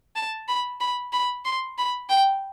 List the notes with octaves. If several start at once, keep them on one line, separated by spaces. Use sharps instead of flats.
A5
B5
B5
B5
C6
B5
G5